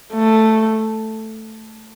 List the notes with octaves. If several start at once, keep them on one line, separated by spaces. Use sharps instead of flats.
A3